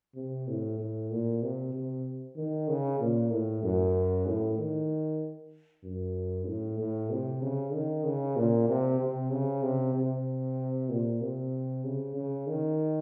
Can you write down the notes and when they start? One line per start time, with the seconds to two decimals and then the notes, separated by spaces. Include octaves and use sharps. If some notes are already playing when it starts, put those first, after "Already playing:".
0.15 C3
0.48 A2
0.79 A2
1.11 A#2
1.42 C3
1.73 C3
2.36 D#3
2.68 C#3
3.00 A#2
3.31 A2
3.63 F#2
4.27 A2
4.58 D#3
5.84 F#2
6.47 A2
6.78 A2
7.10 C3
7.42 C#3
7.73 D#3
8.04 C#3
8.36 A#2
8.68 C3
9.00 C3
9.32 C#3
9.62 C3
9.94 C3
10.89 A#2
11.21 C3
11.84 C#3
12.16 C#3
12.47 D#3